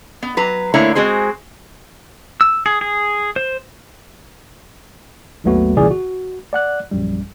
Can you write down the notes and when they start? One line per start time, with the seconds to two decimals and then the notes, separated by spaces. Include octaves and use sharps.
0.23 B3
0.37 F#3 B4 A#5
0.74 D3 A3 A#3 E4 C#5 A#5
0.95 G#3 C4 F#4 G#4 C5
2.41 E6
2.66 G#4
2.81 G#4
3.36 C5
5.44 G#1 D#2 F#3 A3 B3 F#4
5.76 C2 A#2 C#3 E3 G#4 D5
5.91 F#4
6.53 D5 F#5 F#6
6.91 A#1 F#2 G3